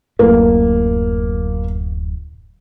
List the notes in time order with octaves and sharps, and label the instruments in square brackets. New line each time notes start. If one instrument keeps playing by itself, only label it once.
[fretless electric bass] D1 F#2 A2 [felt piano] A#3